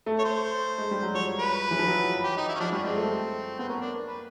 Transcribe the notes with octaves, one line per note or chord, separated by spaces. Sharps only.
A3
C#5
C5
G#3
G3
F#3
F3 C#5
B4
E3
F3
F#3
G4
D#4
E4
C#4
F3 D4
G3 C#4
G#3 C4
A3
B3 C4
A#3 C#4
D4
B4